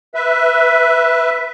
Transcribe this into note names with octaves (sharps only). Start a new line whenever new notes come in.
B4 E5